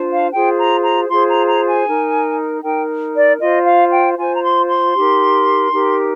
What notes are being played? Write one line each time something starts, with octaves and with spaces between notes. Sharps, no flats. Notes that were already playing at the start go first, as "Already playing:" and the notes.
Already playing: D4 F4 C5
F5
F4 G#4 C5 G5
A#5
A#5
F4 G#4 C5 C6
A#5
A#5
G#5
D#4 A#4
D#4 A#4 G5
D5
F4 C5 D#5
F5
G5
F4 C5 G#5
A#5
C6
C6
D#4 G4 A#4
D#4 G4 A#4